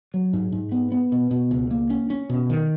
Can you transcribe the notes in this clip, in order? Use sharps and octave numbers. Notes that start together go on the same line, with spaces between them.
F#3
G#2
G#2
B3
B3
B2
B2
C#2
A#3
C#4
C#4
B2
D#3